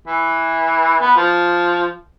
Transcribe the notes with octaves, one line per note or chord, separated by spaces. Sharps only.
E3
B3
F3